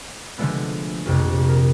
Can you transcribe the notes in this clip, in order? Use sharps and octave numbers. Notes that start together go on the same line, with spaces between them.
D3 F3 G#3 A3 B3
A#1 F2 C3
A#4